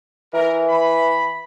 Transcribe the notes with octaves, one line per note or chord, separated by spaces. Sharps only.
E3 A#4
B5